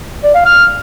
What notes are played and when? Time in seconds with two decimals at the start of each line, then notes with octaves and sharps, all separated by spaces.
0.23 D5
0.34 F5
0.45 F6